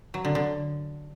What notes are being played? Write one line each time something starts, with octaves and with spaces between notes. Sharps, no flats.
F#3
D3
D3